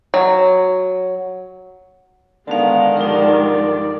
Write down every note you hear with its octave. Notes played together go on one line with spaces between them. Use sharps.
F#3
D3 D#3 G#3 B3 F5 A5
G2 F3 D#4 A#4 D5